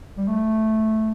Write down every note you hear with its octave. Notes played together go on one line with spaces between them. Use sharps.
G3
A3